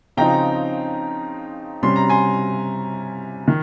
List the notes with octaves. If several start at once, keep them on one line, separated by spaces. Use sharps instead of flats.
C#3 F3 C4 D#4 G5 A#5
C3 G3 C#4 C6
A#5
G#5 C6
D#3